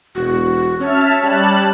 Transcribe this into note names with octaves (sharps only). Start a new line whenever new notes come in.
E1 F#4
C#4 C#5 E5 A5 F6
G3 A5 F#6